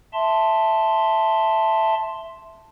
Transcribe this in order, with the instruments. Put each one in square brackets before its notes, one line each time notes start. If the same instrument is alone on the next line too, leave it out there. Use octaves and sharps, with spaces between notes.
[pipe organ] E5 A5 C6